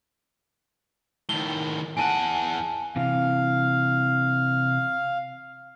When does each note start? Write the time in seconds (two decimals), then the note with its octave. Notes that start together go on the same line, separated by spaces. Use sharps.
1.29 A2 D#3 G7
1.97 E2 F#5 G#5 A5
2.96 C3 E3 F5